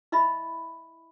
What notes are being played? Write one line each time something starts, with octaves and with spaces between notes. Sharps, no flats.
E4 D#5 E5 B5